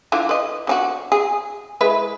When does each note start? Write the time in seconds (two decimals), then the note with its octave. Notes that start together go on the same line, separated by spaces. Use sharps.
0.12 D3 E3 F4
0.29 B4 D#5
0.67 D3 C#4 F#4
1.12 G#4
1.81 G#3 E4 B4